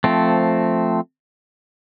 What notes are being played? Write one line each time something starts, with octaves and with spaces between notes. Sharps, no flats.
F3 A3 C4